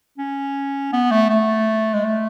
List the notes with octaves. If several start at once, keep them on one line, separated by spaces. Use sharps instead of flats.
C#4
B3
A3
A3
G#3
A3